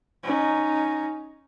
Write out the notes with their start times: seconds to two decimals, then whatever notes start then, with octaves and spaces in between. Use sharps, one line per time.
0.23 C#4 D#4